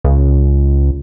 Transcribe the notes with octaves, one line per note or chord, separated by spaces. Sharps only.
C#2